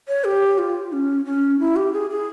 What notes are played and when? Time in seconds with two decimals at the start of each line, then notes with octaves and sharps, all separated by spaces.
0.08 C#5
0.25 G4
0.58 F4
0.92 C#4
1.25 C#4
1.59 E4
1.76 G4
1.93 G#4
2.10 G#4